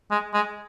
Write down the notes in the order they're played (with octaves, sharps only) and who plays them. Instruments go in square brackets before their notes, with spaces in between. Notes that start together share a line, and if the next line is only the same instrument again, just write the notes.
[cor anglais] G#3
G#3